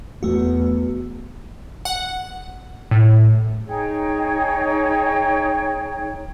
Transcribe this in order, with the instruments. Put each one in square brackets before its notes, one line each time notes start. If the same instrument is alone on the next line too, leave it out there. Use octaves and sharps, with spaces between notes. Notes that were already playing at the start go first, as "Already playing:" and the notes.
[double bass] E2 [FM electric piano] A3 F#4
[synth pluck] F#5
A2
[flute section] D#4 G#4 C#5 G5